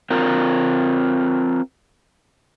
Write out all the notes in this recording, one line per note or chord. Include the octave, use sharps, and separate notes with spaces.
C4 F4 A#4